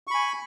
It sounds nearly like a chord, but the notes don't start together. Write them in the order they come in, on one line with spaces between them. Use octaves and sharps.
C#6 B5 G#5